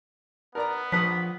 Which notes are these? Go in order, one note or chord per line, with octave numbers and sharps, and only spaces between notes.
B3 A#4 D5 A#5
A#1 F3 B4 D#6 B6